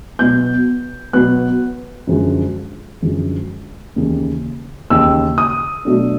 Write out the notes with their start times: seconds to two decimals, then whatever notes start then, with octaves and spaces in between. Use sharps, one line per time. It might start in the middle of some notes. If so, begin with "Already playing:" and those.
0.19 B2 F#3 B3 G6
1.13 B2 F#3 B3 F#6
2.07 F#2 D3 F3 G#3
3.02 F#2 D3 F3 G#3
3.96 D#2 C#3 E3
4.90 D#2 C#3 E3 E6
5.38 D#6
5.85 B2 F#3 A3 D4